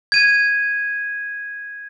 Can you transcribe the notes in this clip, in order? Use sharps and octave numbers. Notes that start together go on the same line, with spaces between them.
G#6 D#7